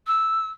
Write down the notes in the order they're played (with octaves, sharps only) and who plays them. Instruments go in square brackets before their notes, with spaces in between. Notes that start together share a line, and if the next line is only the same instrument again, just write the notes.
[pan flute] E6